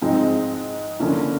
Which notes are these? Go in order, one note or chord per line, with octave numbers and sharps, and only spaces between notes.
G#2 F3 G#3 C4 D#4
D3 F3 A#3 C#4 E4